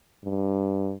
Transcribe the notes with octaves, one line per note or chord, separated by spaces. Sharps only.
G2